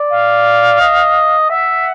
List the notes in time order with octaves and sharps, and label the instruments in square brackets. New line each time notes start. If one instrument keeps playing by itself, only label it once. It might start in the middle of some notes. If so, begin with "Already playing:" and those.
Already playing: [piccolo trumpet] D5
[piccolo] F5
[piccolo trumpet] D#5
[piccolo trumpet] E5 [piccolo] F#5